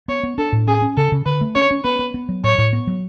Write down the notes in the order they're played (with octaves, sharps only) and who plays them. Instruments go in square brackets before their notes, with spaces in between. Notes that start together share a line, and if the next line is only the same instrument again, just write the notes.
[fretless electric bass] B3 [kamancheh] C#5
[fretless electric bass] B3
[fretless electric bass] D4 [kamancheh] A4
[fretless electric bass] A2
[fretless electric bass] C#4 [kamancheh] G#4
[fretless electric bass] C#4
[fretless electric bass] C#3 [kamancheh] A4
[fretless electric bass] C#3
[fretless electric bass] D3 [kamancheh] B4
[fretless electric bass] A3
[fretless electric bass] C#4 [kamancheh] C#5
[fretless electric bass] C#4
[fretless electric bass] B3 [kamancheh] B4
[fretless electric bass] B3
B3
F#3
[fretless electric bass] A2 [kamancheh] C#5
[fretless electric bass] A2
B3
F#3